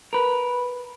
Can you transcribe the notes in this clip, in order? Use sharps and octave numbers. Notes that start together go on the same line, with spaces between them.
A#4 B4